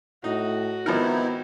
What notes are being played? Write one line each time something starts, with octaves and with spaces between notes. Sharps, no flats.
A2 D#4 F#4
G#1 F3 B3 D#4 E4 A#4